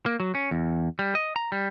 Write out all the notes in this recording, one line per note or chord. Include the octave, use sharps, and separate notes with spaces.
A#3
F#3
C#4
E2
G3
D#5
A#5
G3